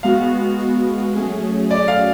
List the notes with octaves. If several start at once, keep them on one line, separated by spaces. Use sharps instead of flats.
G#3 B3 F#4 F5
G#3 B3 F#4
F#3 A3 C#4 G#4
F#3 A3 C#4 G#4 D5
F5